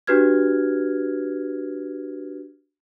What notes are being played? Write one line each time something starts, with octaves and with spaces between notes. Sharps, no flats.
D4 F#4 G4 B4 F6 G#6